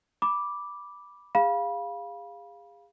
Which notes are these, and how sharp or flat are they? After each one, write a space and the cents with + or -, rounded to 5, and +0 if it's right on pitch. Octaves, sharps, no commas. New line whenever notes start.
B5 -10 D6 +0
G#4 -35 F5 +0 B5 -25